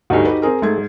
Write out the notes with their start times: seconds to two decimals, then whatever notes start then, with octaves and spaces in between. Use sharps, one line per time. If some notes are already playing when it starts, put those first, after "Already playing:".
0.10 D2 G2 D#4 F#4
0.25 G4 B4
0.42 C4 G#4 A#4
0.62 G#2 A3 G#6